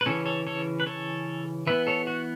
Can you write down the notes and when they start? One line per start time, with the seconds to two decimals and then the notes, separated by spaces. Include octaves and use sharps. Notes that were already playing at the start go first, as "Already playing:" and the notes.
0.01 B4
0.06 C#3 E3 C#4 A4 C#5
0.26 A4 C#5
0.47 A4 C#5
0.80 B4
0.86 A4 C#5
1.67 E3 B3 B4 E5
1.87 A4 C#5
2.07 F#4